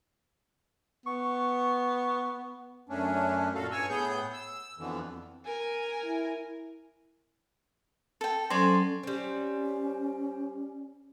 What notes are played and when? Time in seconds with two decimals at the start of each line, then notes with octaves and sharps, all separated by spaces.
1.06 B3 C#6
2.89 F#2 A3 C#4 D4
3.55 F#2 A#2 F#4 A4 F5
3.71 G2 C#5 G#5 C#6 E6
3.90 A2 B3 G#4 G6
4.33 E6
4.78 F2 B2 D3 E3
5.45 A#4 G#5
6.05 E4
8.21 A4 G5
8.50 F#3 C#4 A4 C5 D5 G#5
9.03 G3 C4 C#4